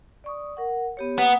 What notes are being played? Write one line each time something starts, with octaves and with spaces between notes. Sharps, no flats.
D5 C#6 D#6
A#4 F#5
B3 G4 C#5
A#3 B3 F#5 D#6